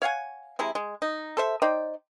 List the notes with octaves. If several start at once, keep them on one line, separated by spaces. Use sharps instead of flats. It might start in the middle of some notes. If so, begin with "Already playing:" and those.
C#5 F5 F#5 G#5
C3 G#3 E4
G#3
D#4
A4 C5 E5
D#4 C5 D5 G5